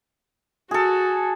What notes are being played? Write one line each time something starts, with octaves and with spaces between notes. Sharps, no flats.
F#4 G#4 A4